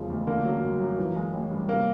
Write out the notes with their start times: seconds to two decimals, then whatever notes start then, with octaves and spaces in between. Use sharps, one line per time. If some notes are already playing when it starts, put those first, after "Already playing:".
Already playing: E1 C#3 F3
0.10 D2
0.27 D3 A#3
0.45 F#3
0.63 G1
0.81 F#2
0.98 E3
1.16 G#3
1.33 A1
1.50 G2
1.68 C3 A#3